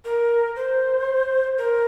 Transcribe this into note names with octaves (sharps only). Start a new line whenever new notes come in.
A#4
C5
A#4